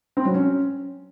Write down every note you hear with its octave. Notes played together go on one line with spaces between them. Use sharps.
C4
F#3
C#4